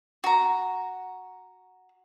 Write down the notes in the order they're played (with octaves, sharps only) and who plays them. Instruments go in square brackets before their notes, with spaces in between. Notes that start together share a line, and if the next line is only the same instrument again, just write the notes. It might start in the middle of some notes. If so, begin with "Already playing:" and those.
[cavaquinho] F#4 A#5